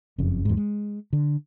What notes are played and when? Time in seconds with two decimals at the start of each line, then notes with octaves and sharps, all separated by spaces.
0.18 F#1 F2 C#3
0.45 E2 G#2
0.57 G#3
1.13 D3